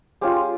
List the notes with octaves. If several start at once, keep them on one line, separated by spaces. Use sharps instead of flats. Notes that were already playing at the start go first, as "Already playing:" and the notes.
G#3 C#4 F4 G4